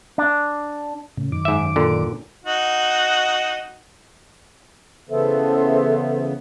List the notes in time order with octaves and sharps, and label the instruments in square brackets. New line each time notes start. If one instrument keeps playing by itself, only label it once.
[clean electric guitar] D4
[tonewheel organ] A2 C#3
F#2 D#3 D6
[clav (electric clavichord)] G#2 E5
A#2 D3
[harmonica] D#4 F#4
[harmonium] C#3 E3 B3 [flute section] A4 C5 E5